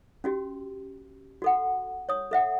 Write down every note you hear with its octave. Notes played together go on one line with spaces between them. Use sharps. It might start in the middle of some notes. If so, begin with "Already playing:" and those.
C#4 F#4 G4
F#4 A4 F#5
C#5 D#6
A4 E5 F#5